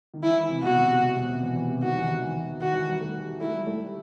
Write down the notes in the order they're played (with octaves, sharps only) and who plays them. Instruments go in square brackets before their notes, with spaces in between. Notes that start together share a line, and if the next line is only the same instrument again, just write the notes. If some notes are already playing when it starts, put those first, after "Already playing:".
[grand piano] D#3
[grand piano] E3 [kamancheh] E4
[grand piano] E3
C3
[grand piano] B2 [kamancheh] F#4
[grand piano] C3
C3
B2
C3
E3
E3
C3
[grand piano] D#3 [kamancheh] F#4
[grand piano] E3
E3
E3
[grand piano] D#3 [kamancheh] F#4
[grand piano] E3
G3
A3
[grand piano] A3 [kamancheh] E4
[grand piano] G3
A3